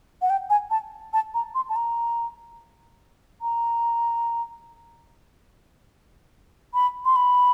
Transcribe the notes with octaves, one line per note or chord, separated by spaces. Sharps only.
F#5
G5
G#5
A5
A5
A#5
C6
A5
A#5
A#5
B5
C6
B5